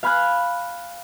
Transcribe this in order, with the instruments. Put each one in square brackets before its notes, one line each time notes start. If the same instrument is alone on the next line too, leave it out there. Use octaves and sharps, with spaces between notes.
[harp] F5 G#5 B5 F6 F#6